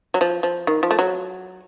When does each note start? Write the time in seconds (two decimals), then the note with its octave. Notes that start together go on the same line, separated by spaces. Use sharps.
0.14 F#3
0.21 F3
0.43 F3
0.67 D#3
0.83 F3
0.91 A3
0.99 F#3